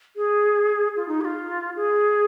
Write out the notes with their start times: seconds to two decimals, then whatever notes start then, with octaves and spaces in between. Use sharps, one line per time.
0.16 G#4
0.96 F4
1.08 D#4
1.20 G#4
1.24 F4
1.76 G#4